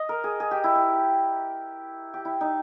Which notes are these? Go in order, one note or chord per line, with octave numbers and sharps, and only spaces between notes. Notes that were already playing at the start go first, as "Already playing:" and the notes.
Already playing: D#5
A#4
G#4
G#4
G4
E4
G4
G4
E4
D#4